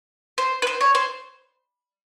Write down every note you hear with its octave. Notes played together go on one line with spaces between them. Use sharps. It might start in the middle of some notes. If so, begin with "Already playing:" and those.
C5
B4
C5
C#5
C5